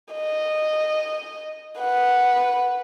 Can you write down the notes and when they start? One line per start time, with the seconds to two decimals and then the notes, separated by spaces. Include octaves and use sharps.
0.14 D#5
1.79 B4 F#5